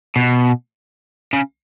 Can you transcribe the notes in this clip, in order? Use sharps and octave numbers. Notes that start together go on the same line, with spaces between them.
B2
C#3